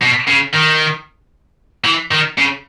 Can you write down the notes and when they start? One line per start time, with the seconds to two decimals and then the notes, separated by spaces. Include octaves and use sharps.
0.02 B2
0.28 C#3
0.54 D#3
1.85 E3
2.11 D#3
2.38 C#3